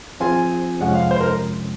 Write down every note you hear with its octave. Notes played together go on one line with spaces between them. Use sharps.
F3 C4 F4 G#4 C5 G#5
F2 C3 F3 G#3 C#4 F#5
F5
C5
A#4